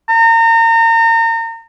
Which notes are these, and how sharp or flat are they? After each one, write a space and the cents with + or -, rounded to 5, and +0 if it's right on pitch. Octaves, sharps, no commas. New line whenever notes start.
A#5 -35